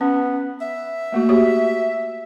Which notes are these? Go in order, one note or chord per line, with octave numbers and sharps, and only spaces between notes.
B3 C#4
E5
A3 A#3 F#4
F#4 G4 C#5